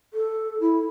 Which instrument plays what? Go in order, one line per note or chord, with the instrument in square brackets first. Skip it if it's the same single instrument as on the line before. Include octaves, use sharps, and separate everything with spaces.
[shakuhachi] A4
E4